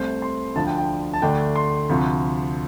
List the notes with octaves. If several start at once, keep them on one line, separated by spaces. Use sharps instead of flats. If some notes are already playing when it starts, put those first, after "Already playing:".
Already playing: C2 C3 A3 C5
C6
D2 D3 F3 D4 A5
G5
G5
A5
D2 D3 A3 D4 G5
C6
D2 C3 F3